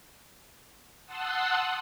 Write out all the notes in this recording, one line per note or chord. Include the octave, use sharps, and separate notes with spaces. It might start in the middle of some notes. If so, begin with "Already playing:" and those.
F#5 A5 C6 D#6 E6 F#6